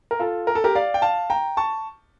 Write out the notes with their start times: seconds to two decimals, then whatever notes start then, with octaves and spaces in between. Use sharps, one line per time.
0.11 A#4
0.19 F4 A4
0.47 A#4
0.55 A4
0.64 G4 A#4
0.75 D5 F5
0.94 G5
1.02 F5 A5
1.30 G5 A#5
1.57 A5 C#6